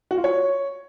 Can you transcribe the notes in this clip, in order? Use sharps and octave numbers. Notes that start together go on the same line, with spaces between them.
F#4
F4
C#5